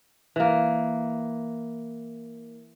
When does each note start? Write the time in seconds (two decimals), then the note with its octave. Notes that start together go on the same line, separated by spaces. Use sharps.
0.36 E3 A#3